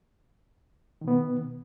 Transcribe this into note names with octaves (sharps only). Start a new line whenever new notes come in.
B2 D#3 B3